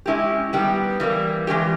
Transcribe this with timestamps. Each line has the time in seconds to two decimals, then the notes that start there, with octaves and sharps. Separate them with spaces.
0.06 G#3 C#4 E4 G4
0.53 D#3 G3 B3 G4
1.00 E3 G3 A#3
1.47 E3 G#3 C#4 G4